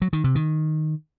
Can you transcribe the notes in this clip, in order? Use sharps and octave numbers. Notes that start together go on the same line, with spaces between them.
F#3
D#3
C3
D#3